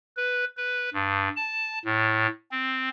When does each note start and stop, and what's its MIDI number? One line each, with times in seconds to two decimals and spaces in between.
0.17 0.45 71
0.57 0.90 71
0.94 1.29 43
1.36 1.79 81
1.85 2.27 45
2.51 2.89 60